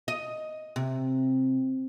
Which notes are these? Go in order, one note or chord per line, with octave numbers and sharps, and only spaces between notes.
D#5
C3